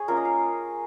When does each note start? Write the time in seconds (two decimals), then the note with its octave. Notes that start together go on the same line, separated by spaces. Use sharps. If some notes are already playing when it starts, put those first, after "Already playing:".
Already playing: G#4 C#5
0.08 A#3 C#4 F4 A#4
0.17 D#5
0.25 F5